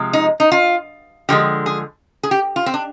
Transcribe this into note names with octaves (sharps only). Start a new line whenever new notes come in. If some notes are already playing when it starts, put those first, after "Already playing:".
Already playing: C3 F3 G#3
D#4
D#4
F4
D3 F3 G#3 G4
G#4
G#4
G4
F4
C4
D4